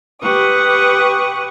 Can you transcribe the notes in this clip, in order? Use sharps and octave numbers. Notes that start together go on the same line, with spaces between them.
G4 B4 F#5 C#6 D#6